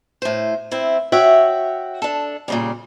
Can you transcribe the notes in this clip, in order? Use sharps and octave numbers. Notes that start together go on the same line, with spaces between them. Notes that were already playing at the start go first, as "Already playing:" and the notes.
A2 C5
C4 E4 C5
F#4 C#5 E5 F#5 G5
D4 A4
A#2 C#3 G3